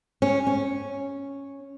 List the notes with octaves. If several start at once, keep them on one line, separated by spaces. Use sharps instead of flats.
C#4
C#4